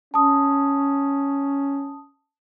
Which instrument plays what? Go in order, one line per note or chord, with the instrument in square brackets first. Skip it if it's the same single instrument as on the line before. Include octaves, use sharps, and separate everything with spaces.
[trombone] C#4 [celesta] A5 D#6